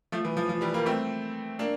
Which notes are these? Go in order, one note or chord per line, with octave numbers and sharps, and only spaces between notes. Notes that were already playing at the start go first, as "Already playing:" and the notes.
F3 A3
E3
F3
F3
E3 G3
G3 A#3
A3 C4
A#3 D4